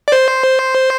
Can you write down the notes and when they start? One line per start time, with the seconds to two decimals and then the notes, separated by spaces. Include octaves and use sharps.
0.08 D5
0.12 C5